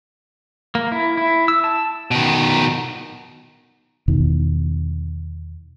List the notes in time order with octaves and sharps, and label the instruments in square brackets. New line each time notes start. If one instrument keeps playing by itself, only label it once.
[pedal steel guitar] A#3
E4
E4
E6
A5
[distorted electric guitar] B2 D#3
[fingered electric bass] E2 B2 D#3 E3